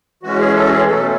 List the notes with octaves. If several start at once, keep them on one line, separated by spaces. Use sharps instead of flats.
E3 G#3 C#4 F#4
G#4
A4
F#4
G#4
B2 F#3 A3 C#4 A4